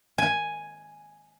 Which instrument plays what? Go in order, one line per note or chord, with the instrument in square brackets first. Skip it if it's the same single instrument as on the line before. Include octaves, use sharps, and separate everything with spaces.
[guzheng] G#5